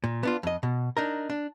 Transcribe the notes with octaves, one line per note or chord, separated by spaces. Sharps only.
A#2
B3 D4 F4
F2 D#5
B2
D4 D#4 A#4
D4